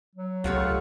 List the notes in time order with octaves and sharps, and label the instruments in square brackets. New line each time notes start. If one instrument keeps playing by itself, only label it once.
[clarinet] F#3
[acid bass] C#2 [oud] A3 G4 C#5 [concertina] F4 F5 F#5